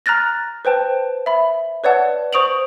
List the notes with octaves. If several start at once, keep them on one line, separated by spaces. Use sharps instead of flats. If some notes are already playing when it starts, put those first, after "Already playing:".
A#5 F6 F#6 A6 A#6
B4 C5 G5 A5
E5 B5
B4 C#5 D5 F#5 A5
C5 C#6 D#6 D7 F7 F#7